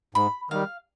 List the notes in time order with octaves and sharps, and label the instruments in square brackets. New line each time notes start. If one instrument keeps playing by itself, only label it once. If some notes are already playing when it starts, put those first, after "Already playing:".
[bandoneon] G#2 [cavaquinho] B5
[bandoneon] D#3 G3 [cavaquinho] F5